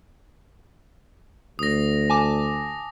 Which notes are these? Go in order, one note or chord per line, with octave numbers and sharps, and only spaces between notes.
D2 D#6 A#6
G#5 A5 D6